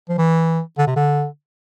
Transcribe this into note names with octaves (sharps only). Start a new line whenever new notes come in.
F3
E3
D3
C3
D3